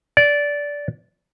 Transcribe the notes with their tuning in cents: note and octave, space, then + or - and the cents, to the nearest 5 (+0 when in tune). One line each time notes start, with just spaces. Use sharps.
D5 -15